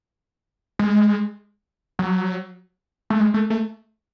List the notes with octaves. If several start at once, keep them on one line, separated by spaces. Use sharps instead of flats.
G#3
F#3
A3
G#3
A3
A3